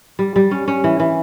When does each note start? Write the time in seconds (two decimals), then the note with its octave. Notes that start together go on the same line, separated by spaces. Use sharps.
0.19 G3
0.36 G3
0.51 C#4
0.68 C#4
0.84 E3
1.00 E3